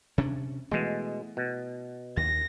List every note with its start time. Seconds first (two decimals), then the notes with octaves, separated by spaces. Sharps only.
0.18 C3 C#4 D4
0.71 B2 E3 G#3 A3
1.37 B2
2.17 D#2 A#6